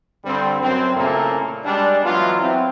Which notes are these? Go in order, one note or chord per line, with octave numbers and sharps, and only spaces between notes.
G2 D3 G3 C4
F#2 C4
A#2 C#3 A3 A#3 E4
G3 G#3 D4
E3 F#3 B3 F4
F#3 C4 E4